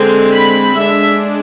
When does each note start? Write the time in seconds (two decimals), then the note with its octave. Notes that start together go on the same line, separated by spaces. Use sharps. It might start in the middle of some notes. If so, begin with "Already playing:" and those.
Already playing: D3 G#3 C4
0.34 B5
0.77 G#3 D4 E5